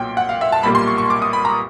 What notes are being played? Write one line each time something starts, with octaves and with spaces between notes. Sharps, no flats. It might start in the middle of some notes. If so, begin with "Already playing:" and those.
Already playing: B1 A#2 F#3 G5
F#5
F5
E5
A5
B1 A#2 G3 A#3 B5
C6
C#6
C#6
D6
D#6
B5
A#5